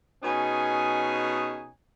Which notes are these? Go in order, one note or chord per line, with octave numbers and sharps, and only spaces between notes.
B2 C#4 D#4 G#4 G#5